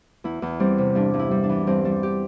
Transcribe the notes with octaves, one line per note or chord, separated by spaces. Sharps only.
E2 E4
E2
G3 C4
C3
G2 D4
G2
E4
G3
D4
E3
G2 C4
G3 D4
G4